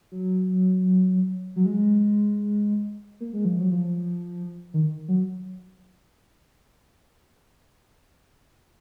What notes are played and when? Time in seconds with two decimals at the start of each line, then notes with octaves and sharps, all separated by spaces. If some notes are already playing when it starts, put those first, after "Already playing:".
0.12 F#3
1.56 F#3
1.66 G#3
3.20 A#3
3.33 G#3
3.45 F3
3.58 F#3
3.71 F3
4.74 D#3
5.08 F#3